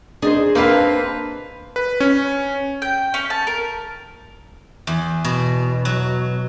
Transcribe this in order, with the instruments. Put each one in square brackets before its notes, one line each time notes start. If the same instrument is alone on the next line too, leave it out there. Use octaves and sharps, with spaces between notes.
[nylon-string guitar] D4 D#4 C5 [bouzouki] G#4
[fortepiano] A#3 F5 [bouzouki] C4 A5 [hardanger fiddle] B4
[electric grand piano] B4
C#4
[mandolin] G5
C#4
A5
A#4
[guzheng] E2
B2
F#3